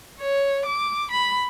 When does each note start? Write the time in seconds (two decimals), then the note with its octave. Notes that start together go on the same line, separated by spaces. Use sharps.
0.20 C#5
0.65 D6
1.11 B5